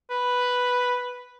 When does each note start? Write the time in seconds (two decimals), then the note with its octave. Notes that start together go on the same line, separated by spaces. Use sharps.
0.10 B4